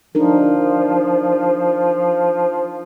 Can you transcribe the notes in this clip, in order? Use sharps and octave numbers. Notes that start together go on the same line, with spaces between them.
F3 D4 D#4 A#4